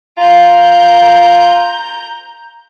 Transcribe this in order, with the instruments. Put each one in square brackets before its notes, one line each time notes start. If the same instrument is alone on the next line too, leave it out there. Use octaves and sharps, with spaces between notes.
[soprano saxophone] F4 [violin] A#5 G6